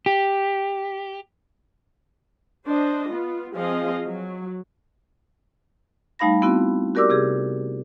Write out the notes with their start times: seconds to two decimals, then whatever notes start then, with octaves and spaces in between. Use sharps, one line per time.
0.06 G4
2.66 D4 C5 D#5
3.10 B3 F4
3.54 F3 C4 G#4 D#5 F5
4.06 F#3
6.19 G3 A3 D#4 F5 B5 A#6
6.42 B3 C4 E4 F#4
6.95 F#4 G4 A#4 D5 D6 E6
7.10 C3 G4 G#4